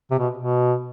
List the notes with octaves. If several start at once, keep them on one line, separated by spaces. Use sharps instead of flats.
C3
B2
B2